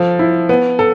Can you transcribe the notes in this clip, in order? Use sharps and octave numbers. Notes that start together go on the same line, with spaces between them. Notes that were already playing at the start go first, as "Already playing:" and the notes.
Already playing: F3 A4
E4
B3
A4